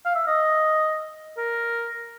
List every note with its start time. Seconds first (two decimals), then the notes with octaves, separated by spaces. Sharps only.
0.05 F5
0.15 E5
0.27 D#5
1.37 A#4